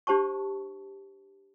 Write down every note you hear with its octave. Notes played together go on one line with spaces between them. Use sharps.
D4 G4 C5 A5 C#6